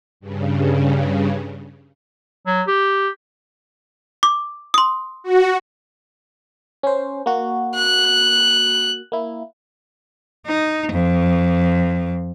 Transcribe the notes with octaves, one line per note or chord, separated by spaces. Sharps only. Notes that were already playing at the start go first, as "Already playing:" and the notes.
G2 C#3
F#3
G4
D6
C6 D#6
F#4
C#4 C5
A#3 F#4
F#6
A#3 E4
D#4
F2